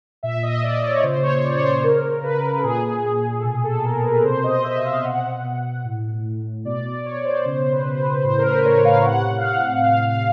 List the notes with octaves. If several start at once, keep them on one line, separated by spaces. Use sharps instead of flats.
A#2 E5
D#5
A#2 D5
C#5
C#5
C#3 C5
C#5
C#5
C#3 D5
C#5
C5
C#3 A#4
C#3 B4
A4
A#2 G#4
A#2
A4
B2 G#4
A4
B2 A#4
B4
C3 C5
D#5
C3 E5
F5
F5
B2 F#5
B2
A2
A2
B2 D5
D5
B2 C#5
C#5
C5
C#3 C5
B4
C#3
B4
A2 C5
A#4
B4
A2 C#5
F5
C3 F#5
F5
C3 F#5
A2 F5
F5